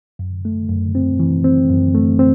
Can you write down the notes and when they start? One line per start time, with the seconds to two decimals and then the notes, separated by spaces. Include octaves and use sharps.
0.19 F#2
0.45 A3
0.69 F#2
0.95 C4
1.19 E3
1.44 C4
1.69 F#2
1.94 A3
2.19 C4